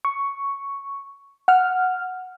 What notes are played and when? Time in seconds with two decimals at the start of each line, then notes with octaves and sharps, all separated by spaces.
0.05 C#6
1.48 F#5 F6